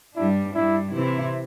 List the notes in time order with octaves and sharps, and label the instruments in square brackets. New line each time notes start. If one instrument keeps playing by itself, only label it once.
[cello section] G2 G3 D4 [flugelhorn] E4
[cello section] G2 G3 D4 [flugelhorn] E4
[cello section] C3 E3 C4 E4